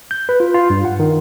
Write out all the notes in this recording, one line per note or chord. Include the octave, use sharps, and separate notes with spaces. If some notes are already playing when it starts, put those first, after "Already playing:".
G6
B4
F4
F4
G2
F#5
D#3